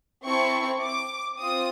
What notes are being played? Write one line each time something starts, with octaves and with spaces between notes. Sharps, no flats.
C4 E4 A4 C#6
D6
C4 F4 D#6